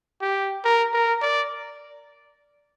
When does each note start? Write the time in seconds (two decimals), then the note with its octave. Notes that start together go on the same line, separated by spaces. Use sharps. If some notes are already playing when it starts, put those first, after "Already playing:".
0.22 G4
0.65 A#4
0.94 A#4
1.22 D5